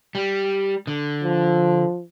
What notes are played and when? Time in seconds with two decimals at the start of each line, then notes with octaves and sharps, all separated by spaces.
0.15 G3
0.87 D3
1.23 F3